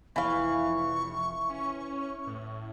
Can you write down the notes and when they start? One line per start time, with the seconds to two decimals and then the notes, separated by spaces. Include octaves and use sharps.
0.16 F1 E3 F5 C#6
1.49 C#4
2.27 A2